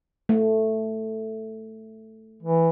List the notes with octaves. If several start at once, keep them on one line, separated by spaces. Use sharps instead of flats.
A3
E3